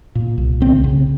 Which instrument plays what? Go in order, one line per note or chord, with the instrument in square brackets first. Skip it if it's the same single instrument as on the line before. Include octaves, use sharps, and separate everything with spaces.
[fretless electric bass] A#2
C2
D2 C4
C#3